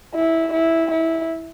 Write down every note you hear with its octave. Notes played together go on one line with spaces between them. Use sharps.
E4
E4
E4